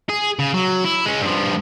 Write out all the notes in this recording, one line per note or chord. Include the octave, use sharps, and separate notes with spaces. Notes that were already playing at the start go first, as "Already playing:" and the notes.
G#4
C#3
F#3
E4
G#3 C#4
G2 F3